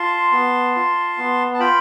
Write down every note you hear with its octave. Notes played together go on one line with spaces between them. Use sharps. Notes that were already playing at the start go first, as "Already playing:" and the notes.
Already playing: F4 A5 C6
B3
F4
B3
A5
F4 G5 B5